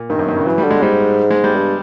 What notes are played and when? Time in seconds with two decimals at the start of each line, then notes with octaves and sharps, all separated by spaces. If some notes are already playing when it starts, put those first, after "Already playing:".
Already playing: A#2
0.10 G2 D#3
0.19 F#2
0.28 G2
0.36 C#3
0.46 E3 F#3
0.58 G3
0.64 D3
0.71 G#3
0.82 G#2 G3
1.31 G#3
1.44 G3
1.56 G2